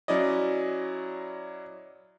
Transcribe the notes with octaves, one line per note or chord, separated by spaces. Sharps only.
F#3 C#4 E4 D5 D#5